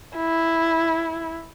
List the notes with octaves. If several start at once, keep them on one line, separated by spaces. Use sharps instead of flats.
E4